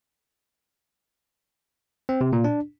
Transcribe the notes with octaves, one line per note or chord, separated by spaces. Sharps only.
C4
C3
A#2
D4